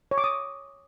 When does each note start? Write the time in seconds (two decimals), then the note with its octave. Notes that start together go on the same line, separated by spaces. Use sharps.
0.11 C#5
0.18 D6
0.24 D#6